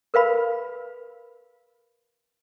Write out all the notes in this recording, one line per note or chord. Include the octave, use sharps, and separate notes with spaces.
A#4 B4 F5 B5